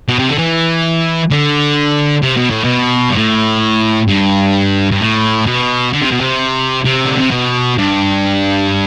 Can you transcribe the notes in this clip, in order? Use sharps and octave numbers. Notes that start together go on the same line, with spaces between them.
B2
C3
D3
E3
D3
C3
B2
A2
B2
G2
A2
G2
G2
A2
B2
D3
C3
B2
C3
C3
D3
C3
B2
G2